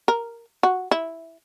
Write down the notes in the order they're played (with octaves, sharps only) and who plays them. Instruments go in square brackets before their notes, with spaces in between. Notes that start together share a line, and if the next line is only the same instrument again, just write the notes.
[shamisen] A#4
F#4
E4